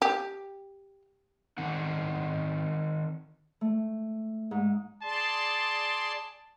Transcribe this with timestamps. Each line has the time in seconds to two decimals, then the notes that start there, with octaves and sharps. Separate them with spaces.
0.02 G4
1.58 D#3 C4 D#4 F#5
3.61 A3
4.51 G#2
5.03 G#4 D5 A5 C6